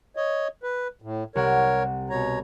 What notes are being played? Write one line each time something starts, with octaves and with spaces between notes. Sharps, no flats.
C#5 D#5
B4
A2
C2 G4 A#4 C#5 F#5
B2 C#5 A#5